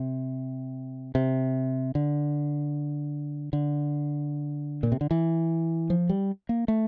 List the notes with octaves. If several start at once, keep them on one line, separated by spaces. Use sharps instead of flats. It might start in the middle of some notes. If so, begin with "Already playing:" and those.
Already playing: C3
C3
D3
D3
A#2
C3
D3
E3
F3
G3
A#3
A3